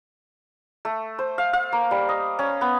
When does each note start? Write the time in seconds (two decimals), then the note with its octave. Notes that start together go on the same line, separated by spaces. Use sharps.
0.85 A3
1.19 C5
1.38 F5
1.53 F5
1.73 A#3
1.91 G3
2.09 D#5
2.39 C#4
2.61 B3